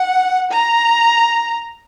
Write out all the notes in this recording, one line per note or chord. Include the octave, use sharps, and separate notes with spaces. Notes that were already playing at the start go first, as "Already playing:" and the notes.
Already playing: F#5
A#5